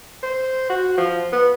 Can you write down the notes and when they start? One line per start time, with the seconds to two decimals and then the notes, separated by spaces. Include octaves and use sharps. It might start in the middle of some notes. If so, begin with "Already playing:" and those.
0.23 C5
0.70 F#4
0.98 F3
1.33 B3